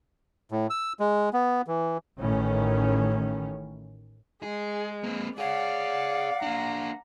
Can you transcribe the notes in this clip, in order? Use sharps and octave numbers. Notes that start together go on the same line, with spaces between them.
A2
E6
G#3
B3
E3
A1 A2 D#3 C#4
G#3 G#4
A#3 C4
G#4 C#5 D5 F5 F#5
A#3 D4 A#5